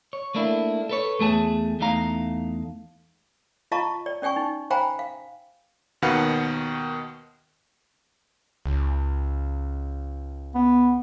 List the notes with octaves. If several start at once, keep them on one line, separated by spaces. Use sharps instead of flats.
C#5
A3 A#3 D4 E4
A4 B4 C#5
E2 A3 G#4 A5
E2 A3 D#4 F5 A#5
F4 D#5 F5 A5 A#5 C#6
D5
C#4 D5 G5 G#5 C#6
D#4
C5 F5 G5 G#5 A#5 B5
F5
D#2 B2 D#3 B4 F5 F#5
C#2
B3